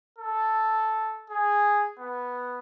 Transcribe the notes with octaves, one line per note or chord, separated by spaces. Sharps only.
A4
G#4
B3